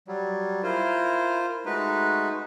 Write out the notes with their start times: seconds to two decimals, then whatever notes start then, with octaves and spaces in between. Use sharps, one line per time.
0.08 F#3 G3
0.63 E4 F4 A#4 C5
1.66 G#3 A3 D#4 F#4 B4